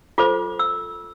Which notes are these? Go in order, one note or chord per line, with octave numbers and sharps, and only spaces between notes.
F4 A4 C5 D6
E6